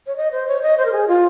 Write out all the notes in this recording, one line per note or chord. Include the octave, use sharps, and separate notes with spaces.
C#5
D#5
C5
C#5
D#5
C5
A#4
G#4
F4